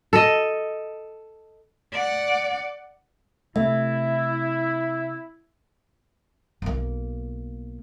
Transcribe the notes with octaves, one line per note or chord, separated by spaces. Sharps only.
A4 D#5
D5 F#5
C3 A3 E4 E5
B1 A#3